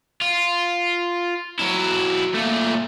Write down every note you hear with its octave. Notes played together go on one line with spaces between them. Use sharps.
F4
F#3 E4
A#2 A3